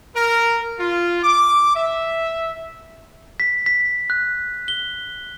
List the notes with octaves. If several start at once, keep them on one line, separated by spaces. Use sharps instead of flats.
A#4
F4
D6
E5
B6
B6
F#6
G7